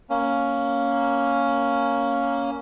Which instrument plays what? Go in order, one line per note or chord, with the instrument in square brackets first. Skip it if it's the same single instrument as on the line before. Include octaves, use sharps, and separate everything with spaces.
[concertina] A#3 C#4